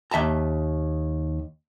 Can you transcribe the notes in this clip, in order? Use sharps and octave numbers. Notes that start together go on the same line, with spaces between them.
D#2 E5 A5 A#5